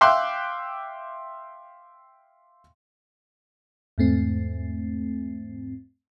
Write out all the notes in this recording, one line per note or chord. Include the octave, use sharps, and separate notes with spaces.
E5 F5 G5 C6 D6 F#6
E2 G#2 A3 C4